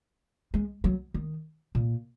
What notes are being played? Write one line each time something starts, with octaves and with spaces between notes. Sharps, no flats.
G#3
F#3
D#3
A#2